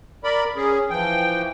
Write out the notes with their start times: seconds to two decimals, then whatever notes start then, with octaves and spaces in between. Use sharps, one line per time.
0.24 A#4 D5 B5
0.56 C#4 G#4
0.90 E3 F3 G5